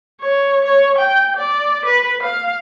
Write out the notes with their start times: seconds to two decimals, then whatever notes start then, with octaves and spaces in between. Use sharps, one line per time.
0.22 C#5
0.65 C#5
0.98 G5
1.36 D5
1.85 B4
2.23 F5